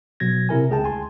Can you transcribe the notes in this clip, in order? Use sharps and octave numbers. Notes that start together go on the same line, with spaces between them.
B2 F#3 G#6 A#6
C3 E4 A#4 G#5
C#2 G#4 G5 A5
D2 G#5 C6